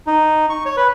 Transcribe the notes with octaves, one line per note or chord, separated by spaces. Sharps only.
D#4
C#6
C#5
B4